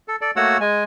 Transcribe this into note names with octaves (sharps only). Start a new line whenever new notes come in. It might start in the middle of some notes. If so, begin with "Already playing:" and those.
A4
A4 D5
A3 A#3 F#4 C#5 F#5 E6
G#3 G#5